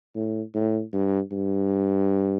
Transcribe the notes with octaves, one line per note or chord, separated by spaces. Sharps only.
A2
A2
G2
G2